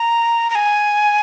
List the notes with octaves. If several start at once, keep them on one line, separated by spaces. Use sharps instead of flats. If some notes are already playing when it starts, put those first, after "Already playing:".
Already playing: A#5
A#5
G#5